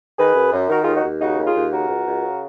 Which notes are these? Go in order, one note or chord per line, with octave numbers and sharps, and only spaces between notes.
D#3 G#4 B4
F#2
F#2
D#3 F#4 A#4
D#2 F4 G#4
D#4 F#4
D#2
C#3 D#4 F#4
D#2
F4 G#4
D#2
C#3 F#4 A#4
C#2
C#2
C#3